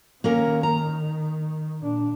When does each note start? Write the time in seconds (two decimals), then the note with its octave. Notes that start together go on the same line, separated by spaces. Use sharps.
0.24 D#3 A#3 C#4 A#4
0.63 A#5
1.83 A#2 D4